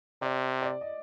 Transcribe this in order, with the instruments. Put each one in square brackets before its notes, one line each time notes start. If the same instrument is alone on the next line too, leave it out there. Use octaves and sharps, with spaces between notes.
[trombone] C3 [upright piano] D5
[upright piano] D5
D#5